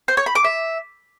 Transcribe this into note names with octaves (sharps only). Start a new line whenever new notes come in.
C5
C#5
B5
D6
E5